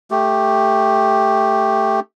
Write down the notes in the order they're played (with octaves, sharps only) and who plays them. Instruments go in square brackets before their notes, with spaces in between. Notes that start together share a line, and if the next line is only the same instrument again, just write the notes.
[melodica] A3 G4